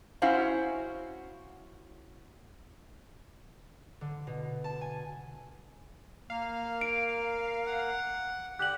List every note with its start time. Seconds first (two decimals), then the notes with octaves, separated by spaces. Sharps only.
0.22 C#4 E4 F#4 C5 F5
4.01 D3
4.27 B2
4.64 A5
4.81 G#5
6.30 A#3 F5
6.81 D7
7.67 F#5
8.59 D3 G4 F#6 F#7